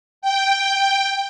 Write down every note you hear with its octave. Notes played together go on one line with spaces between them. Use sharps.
G5